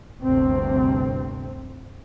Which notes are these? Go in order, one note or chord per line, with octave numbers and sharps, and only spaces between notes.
G1 D2 C3 C4